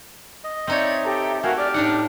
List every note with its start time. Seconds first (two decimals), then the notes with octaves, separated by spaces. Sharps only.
0.44 D#5
0.67 C4 D#4 C#5 D5 E5 G#6
1.05 G4 A4 A#5
1.43 A3 F#4 A#4 F5 G#5
1.58 G4 D5 D6 F6
1.74 A2 D4 D#4 F#5